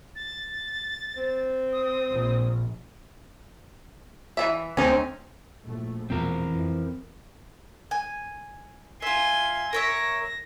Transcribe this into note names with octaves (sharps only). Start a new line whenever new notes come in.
A6
C4
D#6
A#1
E3 F#3 E5
D2 D3 C4 C#4 D#4
A#1 A2 A3
E2 B2 F3 C4 A#4
F2 E3
G#5
F4 E5 G#5 C6
A#4 C#5 E5 A#6